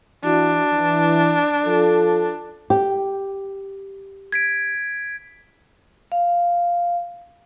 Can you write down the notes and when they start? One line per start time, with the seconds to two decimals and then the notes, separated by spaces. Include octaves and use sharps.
0.24 E3 D4 E4 F#4
0.73 E3
1.65 F3 F4 A4
2.70 G4
4.32 G#6 B6 D7
6.12 F5